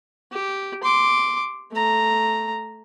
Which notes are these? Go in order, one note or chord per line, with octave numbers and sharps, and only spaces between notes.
G4
C6 D6
A3 A#5